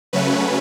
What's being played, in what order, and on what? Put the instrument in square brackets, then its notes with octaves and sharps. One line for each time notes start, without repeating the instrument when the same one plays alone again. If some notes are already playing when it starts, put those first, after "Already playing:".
[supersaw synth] C#3 F#3 A3 C#4 B4